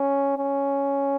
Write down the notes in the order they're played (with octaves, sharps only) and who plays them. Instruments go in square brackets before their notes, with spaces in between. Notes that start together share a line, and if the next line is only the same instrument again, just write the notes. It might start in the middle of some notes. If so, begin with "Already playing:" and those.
Already playing: [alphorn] C#4
C#4